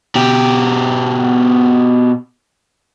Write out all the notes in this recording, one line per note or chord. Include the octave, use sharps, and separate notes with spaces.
B2 G4